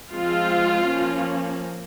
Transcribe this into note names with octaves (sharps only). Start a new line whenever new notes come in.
F3 G#3 C4 F4
F3 A#3 C#4